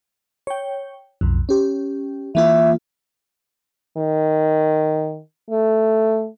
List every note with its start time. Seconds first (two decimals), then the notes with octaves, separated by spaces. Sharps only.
0.47 C#5 G5
1.21 B1 F2
1.49 C#4 G4
2.35 E3 A#3 F4 E5
3.97 D#3
5.50 A3